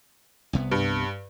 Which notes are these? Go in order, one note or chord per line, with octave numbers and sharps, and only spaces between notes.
C2 C3 B3
G2